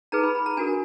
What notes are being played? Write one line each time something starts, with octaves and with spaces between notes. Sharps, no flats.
D#4 G#4 B4 A#5
B5
B5
A#5
D4 F#4 A#4 G#5